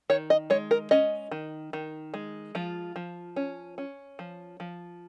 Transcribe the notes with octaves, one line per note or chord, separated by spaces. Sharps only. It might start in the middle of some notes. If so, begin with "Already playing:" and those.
D#3 C#5
D#5
G#3 C#5
A#4
C#4 D#5
D#3
D#3
G#3
F3 F4
F3
C#4
C#4
F3
F3